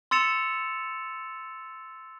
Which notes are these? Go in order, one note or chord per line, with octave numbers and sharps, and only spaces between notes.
C6 E6 A6 C#7 E7 F7